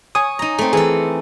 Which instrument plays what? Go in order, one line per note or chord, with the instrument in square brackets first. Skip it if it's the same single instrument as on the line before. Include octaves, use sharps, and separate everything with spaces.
[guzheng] C#5 [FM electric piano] G#5 D#6
[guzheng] D#4 A#5
A3 C4
[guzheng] E3 A4 [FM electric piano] G#4